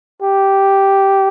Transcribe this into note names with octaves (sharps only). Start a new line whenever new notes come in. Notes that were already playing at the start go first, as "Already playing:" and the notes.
G4